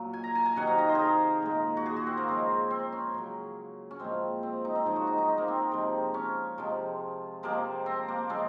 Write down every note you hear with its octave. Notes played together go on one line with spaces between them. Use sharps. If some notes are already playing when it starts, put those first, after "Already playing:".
Already playing: A#2 F#3
G#5
A#5
G#5
G#5
C3 D#3 F#3 F#5
F5
D#5
C5
G#4 A#4
A#2 G#3
F#4
G#4
F#4
C4
A#3
C#3 F3 G#3 C4
C4
C#4
C#3 F#3
C#4
A#2 F3 G#3 C4
C4
D#4
C4
C#3 F3 G#3 G#4
F#4
D#4
D#4
C4
A#3
C4
C3 F3 G#3
C#4
C3 F3 G#3
C3 F3 G#3 A#3
C4
A#3
C#3 F3 G#3 C4